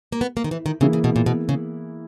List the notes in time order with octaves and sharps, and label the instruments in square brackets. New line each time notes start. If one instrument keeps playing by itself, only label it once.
[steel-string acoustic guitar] A#3
B3
A#3
D#3
E3
D#3
[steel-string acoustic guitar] C#3 [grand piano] E3 A#3 E4 G#4
[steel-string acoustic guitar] C#3
B2
A#2
B2
C#3